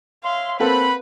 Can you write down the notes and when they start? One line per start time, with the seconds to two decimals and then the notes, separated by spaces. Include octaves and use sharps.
0.24 C#5 E5 F5 C6
0.60 A#3 C4 A4 B4 C5 F#5 B5